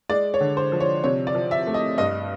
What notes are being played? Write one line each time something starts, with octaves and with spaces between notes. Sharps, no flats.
G#3 D5
C#5
D3
C5
F3
C#5
C3 C#5
D5
F3
E5
A3
D#5
G2 D#5